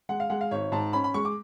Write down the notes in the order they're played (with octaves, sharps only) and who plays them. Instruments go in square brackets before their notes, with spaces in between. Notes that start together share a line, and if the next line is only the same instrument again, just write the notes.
[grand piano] G#3 F#5
F5
G#3 F#5
F5
G#1 C#5
G#2 A5
C#4 B5
B5
G#3 C#6
D6